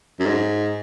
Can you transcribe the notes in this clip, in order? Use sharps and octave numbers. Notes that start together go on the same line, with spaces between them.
F#2
G#2